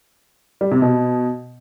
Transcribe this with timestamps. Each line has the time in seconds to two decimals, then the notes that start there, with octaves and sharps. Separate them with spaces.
0.61 G3
0.71 C3
0.82 B2